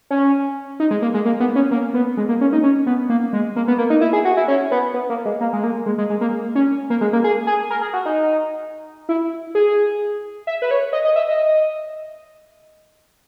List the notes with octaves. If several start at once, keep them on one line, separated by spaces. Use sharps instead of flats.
C#4
D#4
G#3
A#3
G#3
A#3
B3
C#4
A#3
B3
G#3
A#3
C#4
D#4
C#4
B3
A#3
G#3
A#3
B3
A#3
D#4
E4
G#4
F#4
E4
C#4
B3
B3
A#3
G#3
A#3
G#3
A#3
G#3
G#3
G#3
A#3
C#4
A#3
G#3
A#3
G#4
G#4
A#4
G#4
F#4
D#4
E4
G#4
E5
B4
C#5
D#5
D#5
E5
D#5